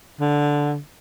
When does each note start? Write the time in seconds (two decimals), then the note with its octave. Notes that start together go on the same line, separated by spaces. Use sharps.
0.20 D3